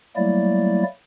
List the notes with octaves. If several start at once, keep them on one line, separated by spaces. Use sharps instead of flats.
F#3 G3 A3 A#3 E4 D5